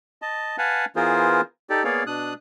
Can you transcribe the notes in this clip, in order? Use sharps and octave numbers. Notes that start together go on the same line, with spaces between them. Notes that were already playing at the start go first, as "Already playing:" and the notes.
D#5 A5
B4 F5 F#5 G#5 A5
E3 B3 F4 G#4 A#4 C5
D#4 G4 A4 D5
A#3 B3 G#4 C#5 D5 F5
B2 D4 D#6 F#6